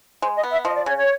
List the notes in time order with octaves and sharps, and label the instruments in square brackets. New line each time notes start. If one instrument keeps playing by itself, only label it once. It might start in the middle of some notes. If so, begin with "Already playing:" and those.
[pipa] G#3 [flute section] C5
[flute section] D#5
[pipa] B3
[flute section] E5
[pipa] F3 [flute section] D#5
[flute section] D5
[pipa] C#3 [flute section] C#5
[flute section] C#5